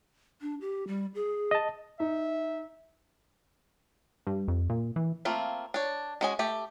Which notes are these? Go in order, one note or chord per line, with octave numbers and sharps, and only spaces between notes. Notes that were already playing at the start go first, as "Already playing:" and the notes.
D4
G4
G3
G#4
D#5 A5
D#4 E5
G2
F2
A#2
E3
A3 A#3 C4 F4
D4 C#5
G#3 C#4 F#4 D#5 G#5
A3 G4